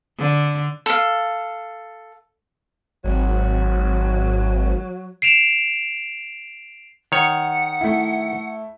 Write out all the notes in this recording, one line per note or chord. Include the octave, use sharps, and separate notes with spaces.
D3
A4 F5
G#1 F#3
C7 D7 E7 F7
D#3 C#5 F#5
A3 E4